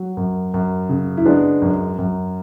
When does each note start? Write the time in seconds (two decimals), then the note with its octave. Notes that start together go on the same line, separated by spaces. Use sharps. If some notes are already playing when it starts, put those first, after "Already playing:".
Already playing: F#3
0.17 F#2
0.54 F#2
0.89 C#3
1.17 E4
1.25 G#3 B3 D4
1.62 F#2
1.98 F#2